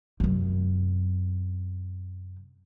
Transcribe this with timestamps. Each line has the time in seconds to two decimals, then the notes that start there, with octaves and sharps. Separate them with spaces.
0.20 F#2 C3